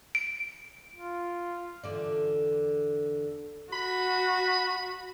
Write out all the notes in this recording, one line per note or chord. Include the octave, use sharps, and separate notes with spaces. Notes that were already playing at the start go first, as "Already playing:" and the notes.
D7
F4
E2 D3 D5
F#4 B5